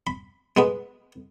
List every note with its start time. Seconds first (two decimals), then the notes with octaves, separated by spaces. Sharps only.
0.07 B5
0.57 G#3 B3 B4